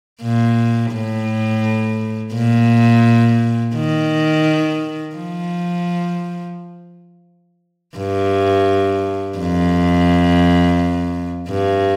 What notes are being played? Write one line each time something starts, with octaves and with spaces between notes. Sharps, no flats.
A#2
A2
A#2
D#3
F3
G2
F2
G2